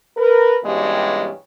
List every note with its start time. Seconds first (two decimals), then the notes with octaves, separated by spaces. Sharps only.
0.17 A#4 B4
0.64 G2 B2 E3 G3 G#3 C#4